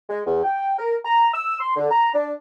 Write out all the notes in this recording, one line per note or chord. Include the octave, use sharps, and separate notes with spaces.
G#3
E2
G5
A#4
A#5
E6
C6
D3
A#5
D4